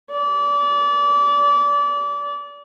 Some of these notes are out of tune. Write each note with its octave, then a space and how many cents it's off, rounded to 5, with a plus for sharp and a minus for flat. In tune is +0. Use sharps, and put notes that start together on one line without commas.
D5 -30